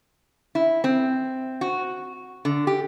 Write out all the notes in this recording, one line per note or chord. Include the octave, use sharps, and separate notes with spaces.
E4
C4
F#4
D3
G4